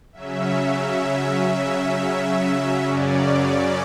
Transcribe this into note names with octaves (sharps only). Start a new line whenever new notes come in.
C#3 F#3 C#4 E5
E5
F#2 C#3 F#3 C#4 D5